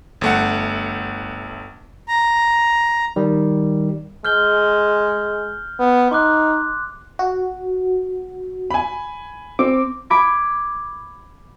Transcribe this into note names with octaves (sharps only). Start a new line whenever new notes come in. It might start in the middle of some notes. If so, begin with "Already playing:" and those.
G1 A3 F#5
A#5
D#3 G3
G#3 F6 G6 G7
B3
D#4 C6 D6 F#6
F#4
G#5 B5
C4 D6
B5 D6 G#6